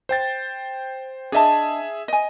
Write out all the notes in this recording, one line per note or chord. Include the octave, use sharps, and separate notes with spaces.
C5 G5 A6
D4 G#4 D#5 E5 A5
D#5 G#5